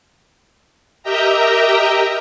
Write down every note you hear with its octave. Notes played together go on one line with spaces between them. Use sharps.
G4 A#4 D#5 E5 G5 A#5